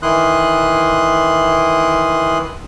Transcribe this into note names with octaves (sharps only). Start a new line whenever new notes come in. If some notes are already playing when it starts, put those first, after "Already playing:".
D#3 E3 E4 C6 D#6 F#6